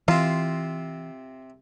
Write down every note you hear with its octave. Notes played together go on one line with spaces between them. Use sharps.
C3 E3 C4 F4